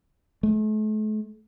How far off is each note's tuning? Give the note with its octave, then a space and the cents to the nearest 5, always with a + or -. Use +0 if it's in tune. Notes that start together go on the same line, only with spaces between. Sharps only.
A3 -40